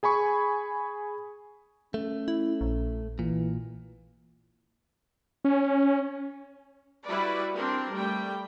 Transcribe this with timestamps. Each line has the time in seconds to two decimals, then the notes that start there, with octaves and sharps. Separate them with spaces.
0.03 G#4 G#5 B5 C#6
1.94 A3 C#4
2.28 E4
2.61 A#1
3.19 A#2 E3
5.44 C#4
7.07 G3 E4 F#4 B4 D5
7.54 C4 D4 A#4
7.93 G3 A3 G5